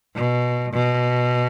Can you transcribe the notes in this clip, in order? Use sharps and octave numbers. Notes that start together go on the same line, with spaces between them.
B2
B2